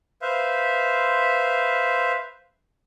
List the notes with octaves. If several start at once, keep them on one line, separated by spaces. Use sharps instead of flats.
B4 C5 E5 F5